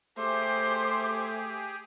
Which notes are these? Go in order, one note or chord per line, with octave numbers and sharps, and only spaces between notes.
A3 G4 G#4 C5 D6